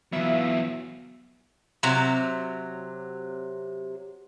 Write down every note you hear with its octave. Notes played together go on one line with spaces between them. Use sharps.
E3 F#3 B3 E5 F5
C3 F#3